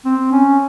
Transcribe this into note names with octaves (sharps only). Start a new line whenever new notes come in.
C4
C#4